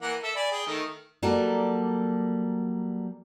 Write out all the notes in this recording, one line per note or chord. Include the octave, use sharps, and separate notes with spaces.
E3 A#3 F#5
A4 E5
D5 G#5 B5
G#4 G5
D#3 A3
F#3 G3 A#3 A4 D5